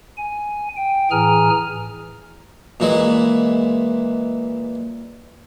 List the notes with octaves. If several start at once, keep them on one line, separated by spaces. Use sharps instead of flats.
G#5
G5
A2 E3 G#4 G#5 A#5 F6
A#2 E3 G#3